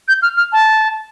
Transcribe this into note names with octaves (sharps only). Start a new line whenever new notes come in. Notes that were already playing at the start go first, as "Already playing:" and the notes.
G6
F6
F6
A5